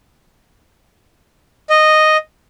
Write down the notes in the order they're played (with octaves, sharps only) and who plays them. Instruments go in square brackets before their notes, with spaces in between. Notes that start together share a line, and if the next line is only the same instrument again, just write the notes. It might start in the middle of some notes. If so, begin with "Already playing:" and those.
[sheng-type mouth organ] D#5